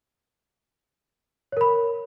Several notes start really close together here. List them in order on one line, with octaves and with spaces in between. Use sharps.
C#5 A#4 B5